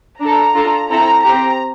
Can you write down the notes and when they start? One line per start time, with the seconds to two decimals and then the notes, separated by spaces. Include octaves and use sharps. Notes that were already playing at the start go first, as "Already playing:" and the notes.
0.20 D4 A4 A#5
0.55 D4 F4 A4
0.90 C4 E4 A4 A#5
1.24 C4 G4 A#5